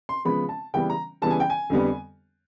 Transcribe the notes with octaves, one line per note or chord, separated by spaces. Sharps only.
C6
C#3 F3 G#3 B3 B5
A5
C#3 E3 G3 B3 G5
A#5
C#3 E3 G3 B3 A5
G#5
G5
G#5
F2 D3 G3 B3